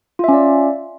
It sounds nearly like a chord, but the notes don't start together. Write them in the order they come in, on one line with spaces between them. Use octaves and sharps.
F4 E5 C#4 D5